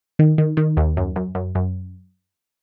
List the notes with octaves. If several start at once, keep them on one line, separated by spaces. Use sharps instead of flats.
D#3
D#3
D#3
D#2
F#2
F#2
F#2
F#2